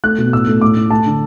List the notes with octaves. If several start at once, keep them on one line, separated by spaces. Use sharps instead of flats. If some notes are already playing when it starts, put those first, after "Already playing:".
A3 F#6
B2
A2 E6
A3
A2 D6
A2
A3 A5
D3